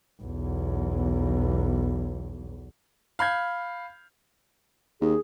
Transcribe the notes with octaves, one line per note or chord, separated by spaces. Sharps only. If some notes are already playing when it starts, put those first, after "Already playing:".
B1 E2
F5 B5 G6 G#6
D#2 G#4